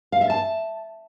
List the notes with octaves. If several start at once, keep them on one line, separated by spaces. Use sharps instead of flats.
F5
E5
A5